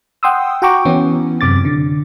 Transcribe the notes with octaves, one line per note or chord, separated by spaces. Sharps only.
F#5 G5 C6 D#6 E6
F#4 F#5 G5 A#5 C#6 D6
E3 B3 C#4 E4
F#2 C3 D6 A6
D3